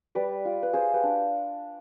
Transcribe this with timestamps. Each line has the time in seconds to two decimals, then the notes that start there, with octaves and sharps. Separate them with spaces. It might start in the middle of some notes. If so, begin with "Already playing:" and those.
0.15 G3 B4 D5
0.45 F4
0.63 B4
0.73 F4 G#4 C5
0.94 G4 B4
1.03 D4